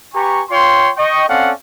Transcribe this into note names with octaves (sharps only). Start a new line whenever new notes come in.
G4 B4 G#5 A#5 C#6
F4 C#5 G5 C6
D#5 G5 C#6
C4 C#4 A4 D5 F5 F#5